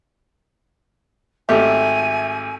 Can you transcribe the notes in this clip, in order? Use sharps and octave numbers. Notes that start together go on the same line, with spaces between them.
G#1 A3 G4 E5 G#5